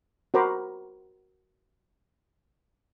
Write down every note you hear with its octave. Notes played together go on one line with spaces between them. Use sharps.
F#4 A#4 C5 A#5 B5 D6